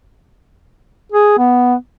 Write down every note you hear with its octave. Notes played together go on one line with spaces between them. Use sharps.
G#4
B3